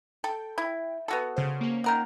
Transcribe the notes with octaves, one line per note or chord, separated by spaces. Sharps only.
A4 G5
E4
B3 F#4 A4
C#3 C5
A#3 C#4
D#3 A#4 F#5